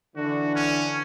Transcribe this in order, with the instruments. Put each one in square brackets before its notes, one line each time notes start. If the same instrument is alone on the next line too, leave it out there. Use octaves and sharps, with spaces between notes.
[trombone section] D3 E3 [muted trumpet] F#4
[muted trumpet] C#4